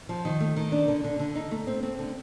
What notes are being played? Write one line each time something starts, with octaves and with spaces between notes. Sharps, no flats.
F3
D#3
A3
D#3
D4
D3
D3
D3
D#4
A3
C4
C4
D3